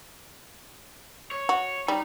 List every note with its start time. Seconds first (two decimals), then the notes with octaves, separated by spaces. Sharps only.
1.31 C#5
1.49 F#4
1.88 G3 D#4 A#5